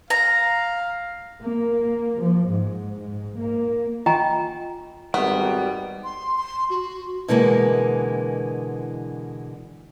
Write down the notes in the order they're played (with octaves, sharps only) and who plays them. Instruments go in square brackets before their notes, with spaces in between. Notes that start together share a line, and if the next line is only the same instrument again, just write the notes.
[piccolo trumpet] F5 [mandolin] A#5
[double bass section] A#3
F3
G#2
G#2
A#3
[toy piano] F4 D#5 G5 G#5 A#5 C#6
[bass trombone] G#1 [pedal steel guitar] G3 [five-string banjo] B3
[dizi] C6
C6
F#4
[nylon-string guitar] B2 D3 E3 G#3 A#3